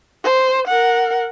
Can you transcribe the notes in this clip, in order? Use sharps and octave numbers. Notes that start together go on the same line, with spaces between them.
C5
A#4 F#5